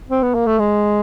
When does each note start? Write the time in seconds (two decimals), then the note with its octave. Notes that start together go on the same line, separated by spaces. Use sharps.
0.10 C4
0.23 B3
0.35 A#3
0.47 A3
0.59 G#3